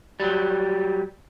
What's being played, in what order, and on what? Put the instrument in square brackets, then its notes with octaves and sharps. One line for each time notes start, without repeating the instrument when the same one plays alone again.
[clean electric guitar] F#3 G3